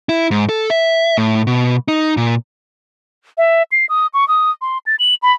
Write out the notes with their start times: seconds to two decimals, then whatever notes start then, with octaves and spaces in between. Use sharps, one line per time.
0.09 E4
0.31 G#2
0.49 A4
0.70 E5
1.18 A2
1.47 B2
1.88 D#4
2.17 A#2
3.38 E5
3.72 C7
3.89 D#6
4.14 C#6
4.28 D#6
4.61 C6
4.86 A6
4.99 F#7
5.23 B5